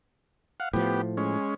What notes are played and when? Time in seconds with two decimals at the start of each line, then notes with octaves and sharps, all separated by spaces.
0.60 F5 F#5
0.73 A2 F3 B3 G4
1.17 G#3 C#4